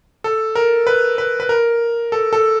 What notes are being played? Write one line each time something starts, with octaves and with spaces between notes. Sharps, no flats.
A4
A#4
B4
B4
B4
A#4
A4
A4